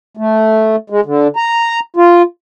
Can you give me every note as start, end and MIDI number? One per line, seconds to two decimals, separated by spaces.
0.17 0.76 57
0.90 1.00 56
1.05 1.27 50
1.36 1.80 82
1.96 2.22 65